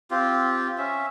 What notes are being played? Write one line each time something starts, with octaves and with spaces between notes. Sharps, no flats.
C4 F4 G4
C#4 E5